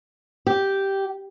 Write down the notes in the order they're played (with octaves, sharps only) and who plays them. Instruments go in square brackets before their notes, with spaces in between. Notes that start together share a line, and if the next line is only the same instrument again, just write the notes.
[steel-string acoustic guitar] G4